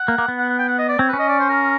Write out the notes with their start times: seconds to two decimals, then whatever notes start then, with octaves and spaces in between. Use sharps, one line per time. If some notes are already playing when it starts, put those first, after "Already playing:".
Already playing: F#5
0.08 A#3
0.18 A#3
0.28 B3
0.38 F#5
0.49 F#5
0.59 G5
0.68 F#5
0.78 D#5
0.88 D5
0.99 C4 C#5
1.09 B4
1.13 C#4
1.19 D#5
1.29 D5
1.39 C5
1.49 A#4